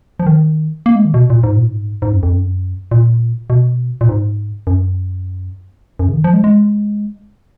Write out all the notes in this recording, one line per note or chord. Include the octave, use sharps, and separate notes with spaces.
F3
D#3
A#3
G#3
D#3
B2
A#2
G#2
A#2
G#2
G#2
F#2
F2
F#2
A#2
B2
A#2
G#2
F#2
F#2
C#3
D#3
F3
G#3
G#3